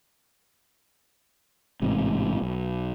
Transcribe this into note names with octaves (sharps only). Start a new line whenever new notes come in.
A1 G#2 C3
B1